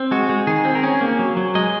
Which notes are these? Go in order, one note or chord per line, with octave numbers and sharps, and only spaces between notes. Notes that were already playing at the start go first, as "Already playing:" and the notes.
Already playing: C4
G#3 F#4
G#3
D#3 G#4
C4
A#4
C#4 G#4
A#3
F#3
F#3
G#3 D#5